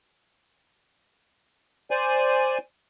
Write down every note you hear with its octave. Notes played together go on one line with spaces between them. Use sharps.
C5 D5 G#5